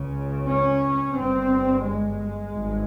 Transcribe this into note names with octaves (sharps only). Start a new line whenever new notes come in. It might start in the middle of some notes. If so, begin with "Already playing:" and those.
Already playing: C#2 C#3
C#4
G1 G2 C4
G#3
G#1 G2